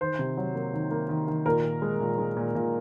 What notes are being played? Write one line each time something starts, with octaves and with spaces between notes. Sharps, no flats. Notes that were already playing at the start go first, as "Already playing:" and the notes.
D#3 C5
C3
F#3
A#3
D#3
A#3
D#3
D#3
A#2 A#4
A#2
G#3
A#2
G#3
A#2
A#2